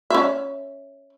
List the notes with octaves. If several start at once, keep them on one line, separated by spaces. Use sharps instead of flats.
C#4 E5